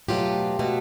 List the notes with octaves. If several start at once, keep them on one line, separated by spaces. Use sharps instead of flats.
E2 B2 F#3 A3 F4 G4
B2 F#3 A3